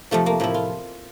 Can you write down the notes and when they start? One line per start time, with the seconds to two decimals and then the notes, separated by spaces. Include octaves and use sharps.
0.11 F2 C3 F3 A3
0.26 A#3
0.40 A2 F3 E4
0.54 F4